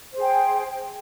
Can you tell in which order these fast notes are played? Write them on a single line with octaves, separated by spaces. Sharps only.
C5 G#4 G5